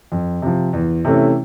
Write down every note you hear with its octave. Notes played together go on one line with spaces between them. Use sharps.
F2
C3 F3
E2
C3 E3 A3 C#4